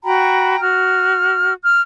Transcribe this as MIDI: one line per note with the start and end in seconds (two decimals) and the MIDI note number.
0.04 0.60 66
0.04 0.60 79
0.04 0.60 82
0.04 0.60 83
0.61 1.53 66
0.61 1.53 89
1.63 1.80 89